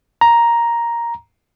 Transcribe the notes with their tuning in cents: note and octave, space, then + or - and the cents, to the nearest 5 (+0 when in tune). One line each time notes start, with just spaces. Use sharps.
A#5 +5